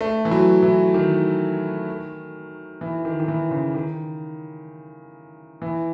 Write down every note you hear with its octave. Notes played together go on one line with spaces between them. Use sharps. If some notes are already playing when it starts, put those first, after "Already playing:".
A3
E3
F#3
E3
D#3
E3
D#3
D#3
E3
C#3
D#3
E3